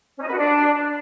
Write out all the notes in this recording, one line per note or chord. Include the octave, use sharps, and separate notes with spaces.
C#4
D#4
B4
F#4
D4